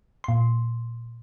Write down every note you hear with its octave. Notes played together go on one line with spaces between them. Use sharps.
A#2 C6